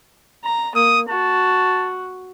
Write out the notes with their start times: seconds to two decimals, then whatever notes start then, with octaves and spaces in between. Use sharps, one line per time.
0.44 A#5
0.76 A#3 D#6
1.09 F#4 A5